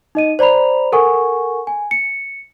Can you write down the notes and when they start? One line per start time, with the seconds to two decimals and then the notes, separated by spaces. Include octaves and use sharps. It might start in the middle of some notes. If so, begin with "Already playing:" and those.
0.15 D#4 D#5 D#7
0.39 C5 D5 A#5 B5 F7
0.92 A4 A#4 F#5 G#5 C#6
1.67 G#5
1.91 C#7